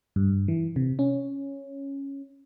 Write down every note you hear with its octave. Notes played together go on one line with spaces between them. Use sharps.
G2
E3
C3
C#4